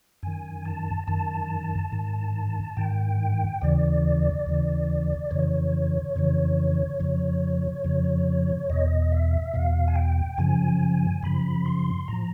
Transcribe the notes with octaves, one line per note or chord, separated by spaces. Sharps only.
F#2 D#3 G#5
A5
F#2 D#3 A5
G#2 D#3
G#2 D#3 G5
D#2 C#3 E3 D5
D#2 C#3 E3
F2 C#3 E3 C#5
F2 C#3 E3
F2 C#3 F3
F2 C#3 F3
E2 B2 D#5
E5
E2 B2 F5
G#5
G5
F#2 C#3 F3 G#5
F#2 C#3 F3 B5
C6
A2 F3 A#5